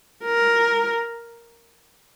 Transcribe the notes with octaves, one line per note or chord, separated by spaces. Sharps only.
A#4